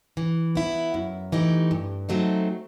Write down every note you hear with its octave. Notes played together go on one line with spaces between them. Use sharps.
E3
B3 E4
F#2
E3 A3 D#4 G4
G2
F#3 A3 C4 D#4